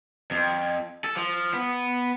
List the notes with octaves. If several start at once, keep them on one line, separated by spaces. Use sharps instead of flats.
F2
A4
F3
B3